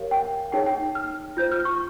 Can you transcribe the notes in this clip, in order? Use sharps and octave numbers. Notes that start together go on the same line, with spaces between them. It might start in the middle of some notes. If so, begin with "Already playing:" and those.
Already playing: G4 A#4 C#5 F5
G5
D#4 G#4 C#5 G5
G5
F6
F4 C5 G6
F6
C#6